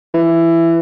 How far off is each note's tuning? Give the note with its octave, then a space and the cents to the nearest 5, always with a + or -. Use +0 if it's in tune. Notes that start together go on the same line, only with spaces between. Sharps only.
E3 +15